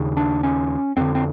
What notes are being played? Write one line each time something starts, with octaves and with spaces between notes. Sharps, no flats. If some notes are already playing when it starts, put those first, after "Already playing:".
Already playing: D#2 C#3
D4
C#4
F2 D3 C4
C4